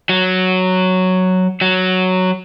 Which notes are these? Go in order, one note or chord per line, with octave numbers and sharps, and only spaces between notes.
F#3
F#3